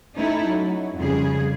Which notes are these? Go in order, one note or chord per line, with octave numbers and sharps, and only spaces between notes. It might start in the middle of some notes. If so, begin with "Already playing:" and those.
A3 C#4 D#4 E4 A4
F#3
F2 C#3 G3 G#4